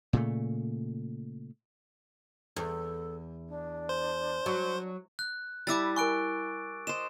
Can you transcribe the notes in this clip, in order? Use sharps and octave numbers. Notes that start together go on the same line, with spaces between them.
A#2 C#3 A3
E2 A4
D4
C5
F#3
F#6
G3 E4 A5 D6 E6 A6
A#4 G#5 C#6 F#6 D7
C5 D#5 E7